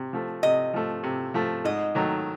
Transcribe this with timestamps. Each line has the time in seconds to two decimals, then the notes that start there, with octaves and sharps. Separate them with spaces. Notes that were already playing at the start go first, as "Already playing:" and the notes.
Already playing: C3
0.13 F3 A3
0.43 C3 D#5
0.73 F3 A3
1.03 C3
1.34 F3 A3
1.64 G#2 D#5
1.95 D#3 F#3 A3